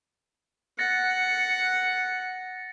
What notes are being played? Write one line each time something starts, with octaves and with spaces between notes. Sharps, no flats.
F#5 A6 A#6 C#7